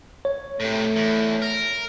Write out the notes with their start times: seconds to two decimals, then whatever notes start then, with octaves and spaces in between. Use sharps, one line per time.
0.25 C#5
0.60 A2 C3 A3
0.96 E2
1.42 A#4